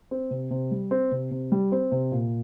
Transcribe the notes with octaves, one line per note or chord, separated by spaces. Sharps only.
C4
C3
C3
G3
C4
C3
C3
G3
C4
C3
A#2